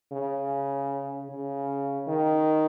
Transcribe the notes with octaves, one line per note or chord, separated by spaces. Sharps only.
C#3
C#3
D#3